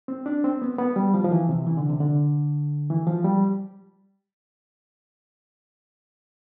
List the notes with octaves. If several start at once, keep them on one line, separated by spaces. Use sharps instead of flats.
C4
D4
C4
B3
B3
G3
F3
F3
E3
C3
E3
D3
C3
D3
E3
F3
G3